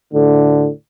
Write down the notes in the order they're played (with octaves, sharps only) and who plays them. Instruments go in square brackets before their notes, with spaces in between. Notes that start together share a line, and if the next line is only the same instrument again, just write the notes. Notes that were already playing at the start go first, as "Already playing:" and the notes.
[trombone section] D2 A2 D3